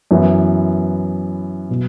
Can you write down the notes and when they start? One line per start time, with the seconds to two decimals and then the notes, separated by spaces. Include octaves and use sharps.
0.11 F#2 E3 B3 E4
1.70 B2 F#3